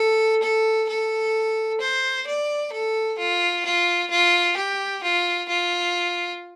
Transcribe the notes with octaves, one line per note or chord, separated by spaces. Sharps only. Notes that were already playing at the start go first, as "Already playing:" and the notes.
Already playing: A4
A4
A4
C5
D5
A4
F4
F4
F4
G4
F4
F4